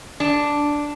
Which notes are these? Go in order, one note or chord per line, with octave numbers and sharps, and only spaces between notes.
D4